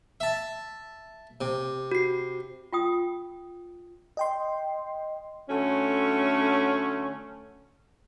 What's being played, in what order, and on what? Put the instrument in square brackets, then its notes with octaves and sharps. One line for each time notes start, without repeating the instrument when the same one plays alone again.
[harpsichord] E5 A5
C3
[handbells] F#4 C7
[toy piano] F4 G5 D#6
[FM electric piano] D#5 G5 C6
[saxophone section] D3 F#3 A3 C#4